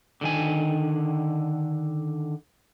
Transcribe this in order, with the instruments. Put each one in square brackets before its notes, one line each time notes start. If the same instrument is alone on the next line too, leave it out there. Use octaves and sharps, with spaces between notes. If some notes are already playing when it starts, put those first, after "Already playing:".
[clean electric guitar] D3 D#3 G#5